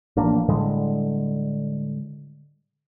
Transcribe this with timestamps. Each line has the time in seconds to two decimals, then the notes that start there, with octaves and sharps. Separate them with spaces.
0.17 A1 F3 A#3 D4
0.48 A2 D3 G3 G#3